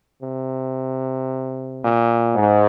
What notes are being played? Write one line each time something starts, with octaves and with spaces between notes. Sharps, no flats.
C3
A#2
G#2